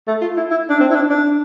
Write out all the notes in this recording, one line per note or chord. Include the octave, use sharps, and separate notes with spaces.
A3
F4
E4
E4
D4
C4
E4
D4
D4